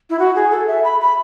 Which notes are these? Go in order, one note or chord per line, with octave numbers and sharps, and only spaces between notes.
E4
F#4
G#4
A4
E5
B5
B5